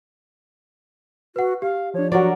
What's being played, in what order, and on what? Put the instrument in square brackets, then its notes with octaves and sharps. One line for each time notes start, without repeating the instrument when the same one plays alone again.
[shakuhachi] F#4 [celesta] B4 F#5
[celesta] G4 [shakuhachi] F5
[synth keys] F3 D4 [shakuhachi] C#5
[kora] F#3 A#4 D5 [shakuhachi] F#4